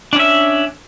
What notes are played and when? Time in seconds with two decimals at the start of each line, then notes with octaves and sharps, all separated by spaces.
0.13 D4
0.16 C#4
0.19 E5